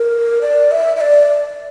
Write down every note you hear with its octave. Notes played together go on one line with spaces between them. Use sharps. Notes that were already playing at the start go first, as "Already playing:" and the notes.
Already playing: A#4
D5
E5
E5
D5